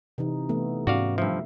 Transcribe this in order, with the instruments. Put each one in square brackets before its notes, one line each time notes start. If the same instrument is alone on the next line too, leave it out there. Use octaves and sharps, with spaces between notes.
[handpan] C3 E3 D#4
E3 A3 B3
[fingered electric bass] G#2 C#4 [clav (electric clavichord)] F#4 D5 F5
[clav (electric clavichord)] G2 F3 [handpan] E5